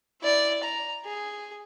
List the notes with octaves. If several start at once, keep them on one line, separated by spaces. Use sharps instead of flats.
E4 D5
A#5
G#4